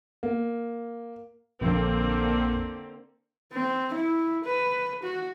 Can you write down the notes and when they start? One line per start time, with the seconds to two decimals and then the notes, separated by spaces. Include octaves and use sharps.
0.23 A#3
1.61 A#1 F2 D3 A#3 C4
3.53 C4
3.94 E4
4.44 B4
5.03 F#4